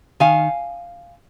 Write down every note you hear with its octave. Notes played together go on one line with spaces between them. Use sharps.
D#3 F5 G#5